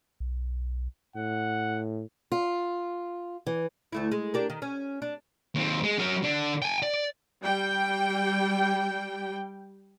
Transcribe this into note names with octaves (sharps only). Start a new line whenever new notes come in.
B1
A2 F#5
F4
E3
D2 A3 E4
G#3
D4 G4 A#4
D#3
C#4
D4
D#2 C4
G#3
F#3 A#4
D3 D4
G5 G#5
D5
G3 G5